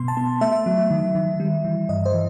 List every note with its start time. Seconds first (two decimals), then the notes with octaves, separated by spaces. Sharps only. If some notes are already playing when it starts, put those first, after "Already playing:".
Already playing: B2 B3 C6
0.08 A5
0.17 B3
0.41 A3 E5
0.66 F#3
0.90 D#3
1.15 D#3
1.40 G3
1.65 E3
1.89 G2 D#5
2.06 C5
2.14 E3